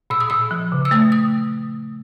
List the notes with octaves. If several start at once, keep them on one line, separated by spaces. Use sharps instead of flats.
A#2 E6
D#6
A#2 E6
F3
C#3
E6
A3 D#6
D#6